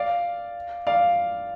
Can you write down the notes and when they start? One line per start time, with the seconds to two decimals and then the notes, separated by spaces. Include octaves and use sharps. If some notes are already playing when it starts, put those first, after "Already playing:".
Already playing: D5 F5
0.87 D5 F5